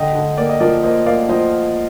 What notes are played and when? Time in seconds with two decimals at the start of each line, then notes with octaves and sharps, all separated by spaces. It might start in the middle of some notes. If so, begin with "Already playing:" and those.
Already playing: D3 D#5 G5
0.15 D3
0.37 A#3 D5
0.49 D#5
0.60 F3 A#4 D5
0.83 A#3 C5 D#5
1.06 A#3 D5 F5
1.29 F3 C5 D#5